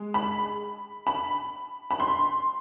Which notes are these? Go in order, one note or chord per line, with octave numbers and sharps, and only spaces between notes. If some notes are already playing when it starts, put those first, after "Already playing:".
Already playing: G#3
B5
B5
B5
C6